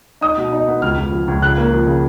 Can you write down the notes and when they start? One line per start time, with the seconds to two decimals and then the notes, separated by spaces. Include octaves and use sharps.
0.21 D#4 D#6
0.37 B2
0.52 D#4
0.68 B3
0.82 C#2 F6
0.97 C#2
1.12 F3
1.28 C#2
1.42 C#3 F#6
1.58 A#3
1.73 F3
1.87 C#3